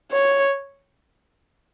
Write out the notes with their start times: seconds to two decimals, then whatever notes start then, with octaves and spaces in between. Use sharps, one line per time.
0.12 C#5